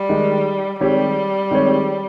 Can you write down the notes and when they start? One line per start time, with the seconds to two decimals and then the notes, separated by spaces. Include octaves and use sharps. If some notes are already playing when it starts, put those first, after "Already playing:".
Already playing: G3
0.09 D#3 G#3 D#4
0.81 D#3 G3 G#3 C4 G4 C#5
1.51 D#3 G#3 C4 G4 C#5